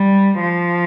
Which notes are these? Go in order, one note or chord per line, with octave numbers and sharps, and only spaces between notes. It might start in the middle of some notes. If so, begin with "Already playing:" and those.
Already playing: G3
F3